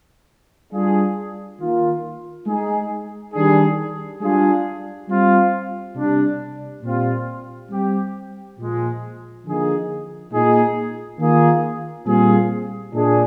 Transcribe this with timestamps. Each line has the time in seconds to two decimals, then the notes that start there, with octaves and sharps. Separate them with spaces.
0.72 G3 D4 F4 G#4
1.59 D#3 A#3 F4
2.47 G#3 D#4 G#4
3.34 D#3 G3 D4 G#4
4.21 G3 D4 F4 G#4
5.08 G3 C4 F4
5.95 C3 G3 D4
6.83 A#2 G3 C4 F4
7.70 G3 C4 G4
8.58 A#2 F3 G#3
9.45 D3 F3 A#3 D#4 G#4
10.32 A#2 G#3 D#4 G#4
11.19 D#3 A#3 F4 G#4
12.06 A#2 G3 C4 F4 G#4
12.94 A#2 G#3 D4 G#4